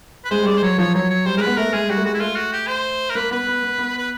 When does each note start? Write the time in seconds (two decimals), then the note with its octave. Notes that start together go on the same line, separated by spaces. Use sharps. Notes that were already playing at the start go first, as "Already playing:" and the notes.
0.25 B4
0.31 G#3 C5
0.43 G3
0.47 G#3 D5
0.58 C5
0.62 F#3 C#5
0.78 F3 C#5
0.95 F#3 C#5
1.10 C#5
1.26 G3 C5
1.37 G#3 A#4
1.41 B3 B4
1.57 A3 A#4
1.73 G#3 G#4
1.89 G3 F#4
1.97 A3
2.05 G#3 F#4
2.14 E4
2.20 A3 F4
2.36 F#4
2.53 G4
2.68 C5
3.10 A#4
3.15 A#3 B4
3.31 B3 B4
3.47 B3
3.63 B3
3.78 B3
3.98 B4